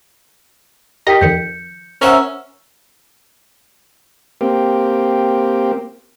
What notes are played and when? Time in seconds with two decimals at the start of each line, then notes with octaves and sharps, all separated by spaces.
1.07 G4 A#4 D#5 G5 B6
1.21 F2 D#3 G6 C#7
2.01 C#4 A#4 C5 E5 F#5 A#5 E6
4.41 A#3 C4 G4